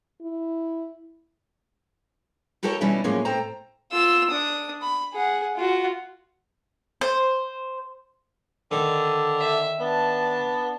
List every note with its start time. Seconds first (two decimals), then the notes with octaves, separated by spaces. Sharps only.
0.22 E4
2.63 E4 F#4 G4 A4 A#4 C#5
2.81 B2 E3 G3 C#4 D#4 E4
3.04 F#2 A2 F3 G#3 A#3 C#4
3.25 A2 C4 A4 C5 G5 A#5
3.92 F4 E6
4.31 D4 D#6
4.82 B5
5.14 G#4 F#5
5.57 F4 F#4
7.01 C5
8.72 D3 D#3
9.39 E5
9.80 B3 D4 A5